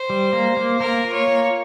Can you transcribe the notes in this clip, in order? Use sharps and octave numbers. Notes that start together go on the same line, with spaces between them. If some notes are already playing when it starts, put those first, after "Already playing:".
Already playing: C5
G3
A#3
A#3
A#3 A#4
F4
C#5
A#3